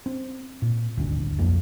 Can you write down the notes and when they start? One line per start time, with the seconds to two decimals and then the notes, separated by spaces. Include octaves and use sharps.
0.06 C4
0.62 A#2
0.97 D#1 G#1 D2
1.38 B1 F2 A3 A#3